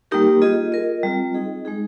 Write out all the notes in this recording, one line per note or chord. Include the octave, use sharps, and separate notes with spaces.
G3 A#3 D#4 G4 A#4
F4 G#4 D#5
F4 A#4 D#5
G3 C4 F4
D#4 G#4 D#5
G#3 D#4 G#4